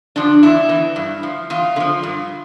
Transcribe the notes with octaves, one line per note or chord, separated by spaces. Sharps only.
D3 F3 D4
E2 E4
E3
G2
F3
E2 F4
D3
F3
G2